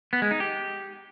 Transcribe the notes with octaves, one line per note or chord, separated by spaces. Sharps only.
B3
G#3
D#4
G4